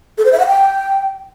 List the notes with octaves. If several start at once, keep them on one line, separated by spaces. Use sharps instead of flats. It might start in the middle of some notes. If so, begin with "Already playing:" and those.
A4
C5
E5
F#5
G5